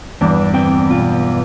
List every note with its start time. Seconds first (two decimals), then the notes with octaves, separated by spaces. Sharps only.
0.21 E2 G2 D4 D5
0.53 D2 C4 G5
0.90 B1 F4